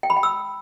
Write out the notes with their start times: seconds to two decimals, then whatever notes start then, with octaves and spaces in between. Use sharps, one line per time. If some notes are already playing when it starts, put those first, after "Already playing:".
0.03 G5
0.10 B5
0.17 G5
0.23 E6